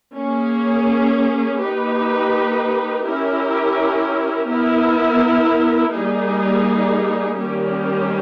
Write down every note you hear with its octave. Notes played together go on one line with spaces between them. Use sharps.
A#3 C#4 G#4
A#3 D#4 G4 B4
C#4 E4 G4 A#4
B3 E4 A#4
G3 A#3 D#4 G#4
D#3 G3 A#3 C#4 G4